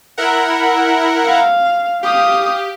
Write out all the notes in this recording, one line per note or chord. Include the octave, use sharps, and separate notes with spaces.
E4 A#4 F#5
F5
G4 F5 D#6